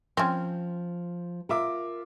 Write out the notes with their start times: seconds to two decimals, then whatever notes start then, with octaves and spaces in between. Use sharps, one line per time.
0.17 F3 C4 C#4
1.49 F4 A#4 E5 D6